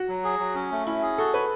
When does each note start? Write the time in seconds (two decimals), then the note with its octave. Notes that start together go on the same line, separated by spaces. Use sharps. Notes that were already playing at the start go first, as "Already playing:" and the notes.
Already playing: F#4
0.08 F#3
0.24 G#4
0.39 F#3
0.55 C#4
0.72 A3
0.87 C#4 E4
1.03 G#4
1.18 F#4 A4
1.34 B4 C#5